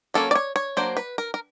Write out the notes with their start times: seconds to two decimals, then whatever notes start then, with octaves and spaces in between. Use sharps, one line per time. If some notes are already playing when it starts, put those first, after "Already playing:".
0.14 F#3 A#3 C#4 A4
0.31 D5
0.35 C#5
0.56 C#5
0.77 F#3 A#3 D4 C5
0.97 B4
1.18 A#4
1.34 A#4